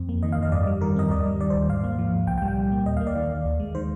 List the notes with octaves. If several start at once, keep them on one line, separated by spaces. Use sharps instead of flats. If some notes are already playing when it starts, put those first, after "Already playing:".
Already playing: F2 C4
A#3
D#3 D#5
F5
F2 D#5
G2 D5
G3
D#3 A#4
C4 D#5
D#2 D5
G3
D#3 D5
C5
D#2
G#2 F5
A#3
F3
G#2
C2 G5
G5
G3
G5
A#2
A#3
D#2 D#5
F5
A#3
D5
D#3
D#2
D#2
G#3
D#3 C5